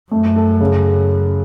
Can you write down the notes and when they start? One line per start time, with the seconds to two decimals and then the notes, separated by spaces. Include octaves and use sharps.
0.11 F#2 A3
0.36 A4
0.60 C#3